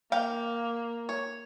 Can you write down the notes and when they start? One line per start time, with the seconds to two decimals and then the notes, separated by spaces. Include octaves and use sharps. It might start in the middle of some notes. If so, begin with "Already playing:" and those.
0.12 A#3 F5 G5
1.09 C#5